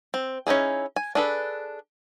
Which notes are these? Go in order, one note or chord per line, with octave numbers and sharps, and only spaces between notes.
C4
C#4 D#4 E4 G#4
G#5
D4 G#4 A4 B4